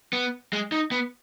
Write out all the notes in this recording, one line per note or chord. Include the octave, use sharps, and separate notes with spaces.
B3
G#3
D#4
B3